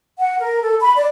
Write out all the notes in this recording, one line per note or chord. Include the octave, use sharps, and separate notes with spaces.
F#5
A#4
A4
B5
D5